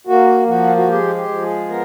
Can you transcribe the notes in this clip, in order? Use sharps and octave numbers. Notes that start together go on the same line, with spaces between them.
A#3 F#4
F3 F#4
F#4
G#3 G4
G4
F3
G#4
B3 A#4